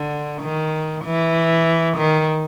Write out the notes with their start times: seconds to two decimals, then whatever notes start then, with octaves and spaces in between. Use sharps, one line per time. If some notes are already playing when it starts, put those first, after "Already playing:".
Already playing: D3
0.42 D#3
1.05 E3
1.98 D#3